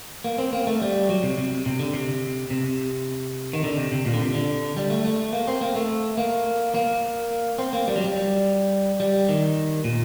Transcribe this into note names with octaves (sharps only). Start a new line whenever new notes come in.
A#3
C4
A#3
A3
G3
F#3
C3
C3
C3
D3
C3
C3
D#3
D3
C3
C3
A#2
D3
C3
D3
G3
A3
A3
A#3
C4
A#3
A3
A#3
A#3
C4
A#3
G3
F#3
G3
G3
D#3
A#2